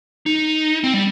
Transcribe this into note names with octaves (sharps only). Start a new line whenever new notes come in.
D#4
C4
G3